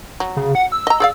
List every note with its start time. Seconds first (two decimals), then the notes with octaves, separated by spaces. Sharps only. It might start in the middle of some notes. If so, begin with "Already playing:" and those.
0.20 F#3
0.36 C#3
0.55 F#5
0.72 E6
0.87 D#5 A#5
1.00 G#4 D5 F5